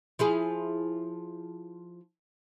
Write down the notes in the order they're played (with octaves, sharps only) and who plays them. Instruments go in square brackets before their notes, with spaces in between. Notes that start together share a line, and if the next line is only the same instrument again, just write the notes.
[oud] F3 E4 G#4